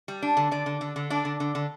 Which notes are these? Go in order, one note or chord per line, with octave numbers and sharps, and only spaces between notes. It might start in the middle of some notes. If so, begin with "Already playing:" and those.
G3
D4
D3
D3 D5
D3
D3
D3
D4 D5
D3
D3
D3